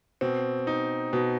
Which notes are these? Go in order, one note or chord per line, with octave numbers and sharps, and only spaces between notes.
B2 C4
D#4
B2